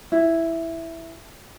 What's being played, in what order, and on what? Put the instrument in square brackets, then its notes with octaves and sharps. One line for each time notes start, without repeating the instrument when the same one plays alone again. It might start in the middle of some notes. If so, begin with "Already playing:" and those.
[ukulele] E4